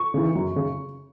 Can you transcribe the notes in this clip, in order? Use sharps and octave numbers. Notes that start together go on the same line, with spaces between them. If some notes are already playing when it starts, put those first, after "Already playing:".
Already playing: C#6
C#3 E3
F#2
C#3